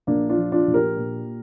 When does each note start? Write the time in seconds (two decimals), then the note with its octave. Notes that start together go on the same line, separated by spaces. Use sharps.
0.07 A#1 A#3 D4
0.29 D4 F4
0.37 F3
0.52 D4 F4
0.67 A#1
0.74 G4 A#4
0.96 A#2